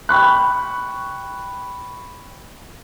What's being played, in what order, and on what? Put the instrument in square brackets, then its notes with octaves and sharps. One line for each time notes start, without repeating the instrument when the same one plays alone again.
[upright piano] G5 B5 C#6 F#6